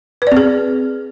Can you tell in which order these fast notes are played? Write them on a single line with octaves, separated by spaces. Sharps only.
B4 D5 C4 G#4